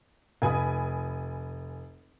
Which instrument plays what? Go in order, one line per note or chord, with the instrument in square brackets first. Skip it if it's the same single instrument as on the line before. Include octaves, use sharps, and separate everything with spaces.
[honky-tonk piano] F1 G#5 B5 D#6